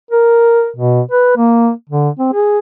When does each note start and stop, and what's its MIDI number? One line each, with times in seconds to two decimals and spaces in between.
0.11 0.69 70
0.76 1.01 47
1.11 1.36 71
1.37 1.71 58
1.90 2.09 50
2.19 2.30 60
2.33 2.59 68